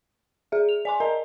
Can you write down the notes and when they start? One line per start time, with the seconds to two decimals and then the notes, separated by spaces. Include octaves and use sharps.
0.52 G#4 E5
0.69 F7
0.85 D5 G#5 C6
1.00 A#4 D#5 A#5